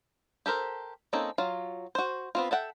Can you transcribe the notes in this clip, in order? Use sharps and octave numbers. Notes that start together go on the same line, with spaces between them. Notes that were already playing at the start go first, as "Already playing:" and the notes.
G4 A4 A#4 C5
A#3 C4 C#4 D#4 A4
F#3 F4 F5
F#4 C5
B3 C4 F4
A4 E5 F#5 G5